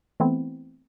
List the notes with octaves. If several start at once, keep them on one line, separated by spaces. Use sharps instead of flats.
E3 A3 B3 C4 E4